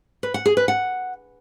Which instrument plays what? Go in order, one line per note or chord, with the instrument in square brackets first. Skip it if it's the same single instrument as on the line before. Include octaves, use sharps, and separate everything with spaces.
[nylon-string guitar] B4
F#5
G#4
B4
F#5